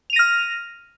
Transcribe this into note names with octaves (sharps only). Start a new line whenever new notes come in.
F6 A#6 D#7 F7